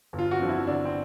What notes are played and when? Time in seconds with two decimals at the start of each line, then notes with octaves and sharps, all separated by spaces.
0.13 G1
0.19 F4
0.31 F#4
0.39 F2 D3 F3
0.49 E4
0.67 G1 D4
0.85 C4